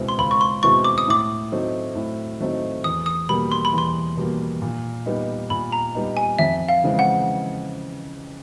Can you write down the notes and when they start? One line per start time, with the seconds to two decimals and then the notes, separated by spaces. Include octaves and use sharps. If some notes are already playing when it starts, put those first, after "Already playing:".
Already playing: C#2 B2 G#3 C4 E4
0.08 C6
0.18 C#2 B5
0.31 C#6
0.41 C6
0.63 B2 G#3 C4 E4 C#6
0.84 D6
0.98 D#6
1.08 A2 D6
1.52 F#3 A3 C4 D#4
1.95 A2
2.40 F#3 A3 C4 D#4
2.84 E2 D#6
3.06 D#6
3.29 B2 G3 A#3 B5
3.52 C6
3.65 B5
3.73 E2 C6
4.17 B2 G3 A#3
4.62 A#2
5.06 G3 B3 D#4
5.50 A#2 B5
5.72 A#5
5.95 G3 B3 D#4
6.17 G#5
6.39 F2 E5
6.68 F5
6.84 C#3 E3 G#3 C4
6.99 F#5